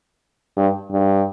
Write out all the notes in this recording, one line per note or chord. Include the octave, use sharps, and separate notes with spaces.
G2
G2